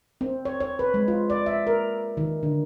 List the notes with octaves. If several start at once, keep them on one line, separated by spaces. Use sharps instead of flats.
C4
C#5
C#5
B4
G#3
F4
D5
E5
A#4
D#3
D3